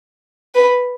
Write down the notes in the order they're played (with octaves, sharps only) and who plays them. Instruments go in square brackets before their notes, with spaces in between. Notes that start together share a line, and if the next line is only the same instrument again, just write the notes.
[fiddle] B4